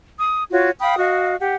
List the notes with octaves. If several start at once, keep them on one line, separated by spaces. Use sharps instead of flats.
D#6
F4 F#4 C#5
F5 G5 B5 D#6
F#4 D#5 F5
G4 F#5